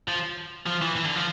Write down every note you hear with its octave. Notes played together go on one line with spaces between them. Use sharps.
F3
F3
E3
E3
D3
F3